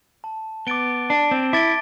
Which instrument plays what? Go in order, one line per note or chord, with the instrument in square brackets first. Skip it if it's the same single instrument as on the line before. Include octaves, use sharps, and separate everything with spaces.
[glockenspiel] A5
[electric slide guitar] B3 [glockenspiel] D6 A6 D7 G7
[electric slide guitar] D4 [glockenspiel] A5
[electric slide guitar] C4
[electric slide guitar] E4 [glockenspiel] D6 A6 D7 G7